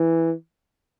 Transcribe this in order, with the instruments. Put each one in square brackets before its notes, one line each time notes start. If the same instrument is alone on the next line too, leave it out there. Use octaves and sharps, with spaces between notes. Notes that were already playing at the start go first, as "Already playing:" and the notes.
Already playing: [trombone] E3